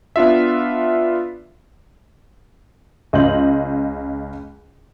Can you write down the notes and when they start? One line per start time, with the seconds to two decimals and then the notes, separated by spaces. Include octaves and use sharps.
0.16 B3 D4 F4 E5
3.13 C#2 D#5 C6 G6 F#7